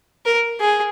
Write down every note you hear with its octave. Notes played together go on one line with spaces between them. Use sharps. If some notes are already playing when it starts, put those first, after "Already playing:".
A#4
G#4